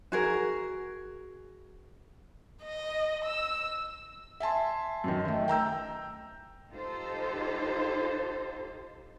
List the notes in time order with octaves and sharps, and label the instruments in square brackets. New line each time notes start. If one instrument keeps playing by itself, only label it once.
[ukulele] F#4 G#4 A#4
[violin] D#5
E6
[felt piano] E5 G#5 A5 C6
F#2 D#3
D#3 A3
G5 A#5 E6 G6
[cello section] D#4 F4 G4 A4 C5